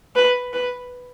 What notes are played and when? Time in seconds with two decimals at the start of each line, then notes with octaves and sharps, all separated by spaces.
0.16 B4
0.53 B4